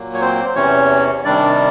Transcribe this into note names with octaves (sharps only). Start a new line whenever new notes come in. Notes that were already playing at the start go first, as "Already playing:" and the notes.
Already playing: A#2 F#3 A#3
C#5
C4 C5
E2 C3 E3 C#4 C#5
C3 D#3 G3 D4 D5